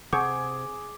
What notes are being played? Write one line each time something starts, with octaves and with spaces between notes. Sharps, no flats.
C3 G#4 F#5 C#6 D6 G6